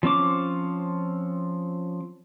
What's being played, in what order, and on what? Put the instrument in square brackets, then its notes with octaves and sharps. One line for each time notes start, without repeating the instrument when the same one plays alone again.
[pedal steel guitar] F3 C4 C#4 D6